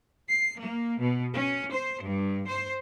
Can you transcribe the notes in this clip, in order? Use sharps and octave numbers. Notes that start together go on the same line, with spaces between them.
C7
A#3
B2
C#4
C5
G2
C5